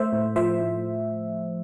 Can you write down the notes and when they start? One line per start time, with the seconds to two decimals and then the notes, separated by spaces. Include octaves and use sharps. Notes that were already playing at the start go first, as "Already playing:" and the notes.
Already playing: A3 C5 E5
0.12 A2
0.36 F3 C5 E5
0.61 A2